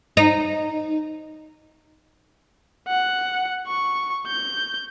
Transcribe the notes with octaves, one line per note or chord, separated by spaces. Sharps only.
D#4
F#5
C#6
G6